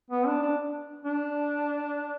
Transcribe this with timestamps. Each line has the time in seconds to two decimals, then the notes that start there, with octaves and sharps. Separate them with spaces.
0.10 B3
0.26 D4
0.42 D4
1.05 D4